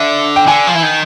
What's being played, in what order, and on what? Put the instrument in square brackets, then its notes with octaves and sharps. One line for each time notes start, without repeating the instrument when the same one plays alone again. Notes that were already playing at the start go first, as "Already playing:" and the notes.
Already playing: [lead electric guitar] D3 [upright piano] E5
[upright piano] G5
[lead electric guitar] D3 [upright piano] G#5
[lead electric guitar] F3
E3
D#3